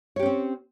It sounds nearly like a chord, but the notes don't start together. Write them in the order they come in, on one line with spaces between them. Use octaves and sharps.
C#5 G4 C#4 C4